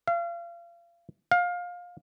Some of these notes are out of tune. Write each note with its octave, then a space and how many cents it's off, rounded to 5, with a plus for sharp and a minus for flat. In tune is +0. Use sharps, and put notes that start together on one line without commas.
F5 -30
F5 +25